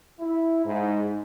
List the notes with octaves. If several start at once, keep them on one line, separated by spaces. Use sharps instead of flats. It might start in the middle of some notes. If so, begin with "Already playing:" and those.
E4
G#2